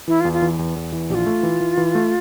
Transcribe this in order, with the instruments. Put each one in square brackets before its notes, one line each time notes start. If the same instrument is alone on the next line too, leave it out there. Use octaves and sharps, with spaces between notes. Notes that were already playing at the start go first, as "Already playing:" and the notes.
[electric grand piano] E3 [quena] E4
[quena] F4
[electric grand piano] E2
[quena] F4
[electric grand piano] E3
E2
E2
E3
[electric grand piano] A#1 [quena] G4
[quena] F4
[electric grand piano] A3
E3
E3
E3
A3